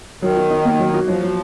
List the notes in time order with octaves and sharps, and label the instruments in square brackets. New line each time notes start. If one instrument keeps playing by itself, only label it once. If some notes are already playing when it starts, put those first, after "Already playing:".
[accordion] D#3 [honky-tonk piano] F#3
[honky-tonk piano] F#4
D#4
A#3
F#3
F#4
[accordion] F3 [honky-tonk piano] F#3
[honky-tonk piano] F#3